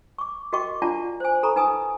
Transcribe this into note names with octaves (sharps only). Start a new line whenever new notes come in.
C#6 D6
F#4 A#4 D#5 G5 C#6 D6
D4 F4 D5 F#5 A5 A#5
C5 G#5
A4 A#5 B5 C#6
D#4 B4 G#5 A5 D#6